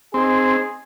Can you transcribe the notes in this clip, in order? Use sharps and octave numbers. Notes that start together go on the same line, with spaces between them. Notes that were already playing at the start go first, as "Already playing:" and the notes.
C4 D#4 G#4